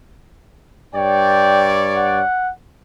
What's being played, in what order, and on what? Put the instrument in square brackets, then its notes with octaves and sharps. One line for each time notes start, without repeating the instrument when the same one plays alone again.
[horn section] G2 C#5 D5 [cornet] G5
[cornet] F#5